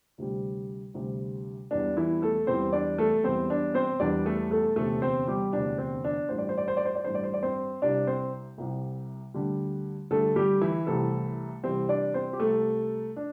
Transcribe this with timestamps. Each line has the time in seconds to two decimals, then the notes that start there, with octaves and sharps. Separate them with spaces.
0.18 D2 C3 G3
0.94 D2 C3 G3
1.71 E1 E2 E3 G3 D4
1.97 E3 E4
2.22 A3 A4
2.47 E1 E2 E3 G3 C4 C5
2.73 D4 D5
2.98 A3 A4
3.23 E1 E2 E3 G3 C4 C5
3.50 D4
3.74 C4 C5
4.00 E1 E2 E3 G3 D4 D5
4.26 A3 A4
4.51 A3 A4
4.76 E1 D2 C3 A3 A4
5.02 C4 C5
5.28 G3 G4
5.53 E1 D2 C3 D4
5.78 C4
6.04 D4
6.29 A1 G2 G3 C5
6.38 D5
6.49 C5
6.58 D5
6.68 C5
6.77 D5
6.85 C5
6.95 D5
7.04 A1 G2 G3 C5
7.15 D5
7.24 C5
7.34 D5
7.43 C4 C5
7.82 C2 C3 G3 D4 D5
8.07 C4 C5
8.58 C2 C3 G3
9.34 D2 D3 G3
10.11 D2 D3 G3 A3 A4
10.36 G3 G4
10.61 E3 E4
10.87 C2 C3 E3 G3 A3 A4
11.63 C2 C3 E3 G3 C4 C5
11.89 D4 D5
12.14 C4 C5
12.33 G4
12.40 C2 C3 G3 A3 A4
13.16 D4